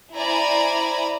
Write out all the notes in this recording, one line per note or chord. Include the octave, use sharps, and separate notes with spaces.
E4 C5 D5 G#5 A#5 B5